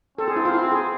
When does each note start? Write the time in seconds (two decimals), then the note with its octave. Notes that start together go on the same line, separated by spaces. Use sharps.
0.18 C4 A4
0.28 G#4
0.36 E4
0.45 F4
0.55 E4
0.72 G#4